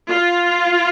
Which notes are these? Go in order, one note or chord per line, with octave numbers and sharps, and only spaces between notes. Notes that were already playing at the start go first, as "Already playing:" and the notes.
F4